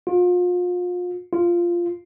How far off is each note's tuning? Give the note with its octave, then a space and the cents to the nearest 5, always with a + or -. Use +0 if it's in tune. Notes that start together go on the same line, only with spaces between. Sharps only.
F4 +35
F4 -10